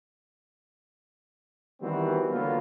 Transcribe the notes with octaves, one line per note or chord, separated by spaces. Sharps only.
D#3 E3 G3 B3 C4 F#4
D3 F#3 A#3 B3 F4